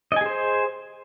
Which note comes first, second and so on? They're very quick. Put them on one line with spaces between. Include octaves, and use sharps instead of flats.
D#5 G#5 G#4 C5